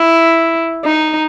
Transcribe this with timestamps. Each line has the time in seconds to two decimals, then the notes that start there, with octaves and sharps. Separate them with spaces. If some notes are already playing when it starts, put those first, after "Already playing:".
Already playing: E4
0.85 D#4